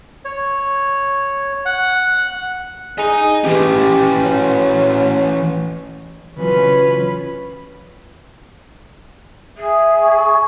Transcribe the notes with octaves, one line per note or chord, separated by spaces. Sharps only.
C#5
F#5
G#4 D#5 A#5
E3 C#4 G4
F#3
C#3 E3 F#3 C#4 F4 B4
G#4 E5
C#6